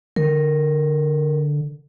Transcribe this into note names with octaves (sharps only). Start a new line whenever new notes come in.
D3 A#4